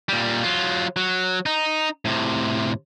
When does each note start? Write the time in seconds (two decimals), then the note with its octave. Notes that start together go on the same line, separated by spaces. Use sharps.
0.09 A#2 G3
0.44 F#3 F4
0.96 F#3
1.46 D#4
2.05 A2 C3